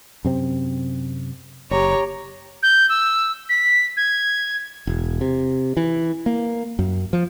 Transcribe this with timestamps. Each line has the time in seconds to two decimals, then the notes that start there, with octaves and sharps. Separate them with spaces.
0.25 F#2 C3 C4
1.71 F#1 G4 C#5 A#5
2.63 G6
2.89 E6
3.49 B6
3.97 G#6
4.87 E1
5.21 C3
5.77 E3
6.26 A#3
6.79 F#2
7.13 F3